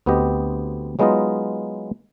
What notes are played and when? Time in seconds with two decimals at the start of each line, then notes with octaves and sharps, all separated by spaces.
0.06 D2 B3 C4 G4 D#5
0.99 F#3 G#3 B3 D#4 F4 D#5